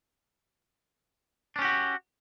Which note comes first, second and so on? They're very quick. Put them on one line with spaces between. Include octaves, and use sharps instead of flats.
D4 C#4 G4 F#4